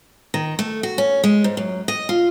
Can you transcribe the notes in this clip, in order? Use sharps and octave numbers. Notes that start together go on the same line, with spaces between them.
D#3
A3
F#4
C#4
G#3
G#2
F#2
D#5
F4